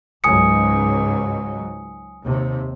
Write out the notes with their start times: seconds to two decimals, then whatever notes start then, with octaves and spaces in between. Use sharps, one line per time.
0.24 C#2 G#2 F#3 G#5 D#6 C#7
2.23 D#2 C3